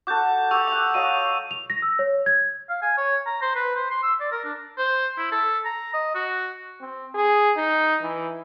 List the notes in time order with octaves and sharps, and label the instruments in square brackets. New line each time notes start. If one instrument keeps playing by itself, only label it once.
[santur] F#4 A4 [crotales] D6 G6
[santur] G4 [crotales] C#6 E6 F7
[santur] E5 F#5 [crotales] F7
[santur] F#3 D#5 F5 [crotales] D#7
[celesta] F7
A#6
E6
C#5
G#6
[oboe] F5
G#5
C#5
A#5
C5
B4
C5
C6
E6
D5
A#4
D4
C5
E4
A4
A#5
D#5
F#4
[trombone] C4
G#4
D#4
E3